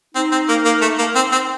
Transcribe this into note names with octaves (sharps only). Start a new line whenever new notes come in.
C4 D#4
C4
A#3
A#3
A3
A#3
C4
C4